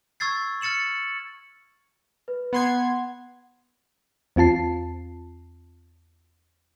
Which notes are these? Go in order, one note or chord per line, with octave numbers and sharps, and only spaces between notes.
C#6 E6 G#6 A6 C7
F6 A6 C#7 E7 F#7
B4
B3 F#5 C6 G#6
E2 C4 F4 A5 C7